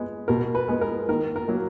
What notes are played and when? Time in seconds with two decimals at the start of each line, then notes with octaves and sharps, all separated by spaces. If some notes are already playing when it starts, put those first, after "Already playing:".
Already playing: G#3 B3
0.28 B2 A#4
0.55 B4
0.68 G#3 B3
0.81 A#4
1.09 D#3 A#4
1.36 A#4
1.48 F#3 A#3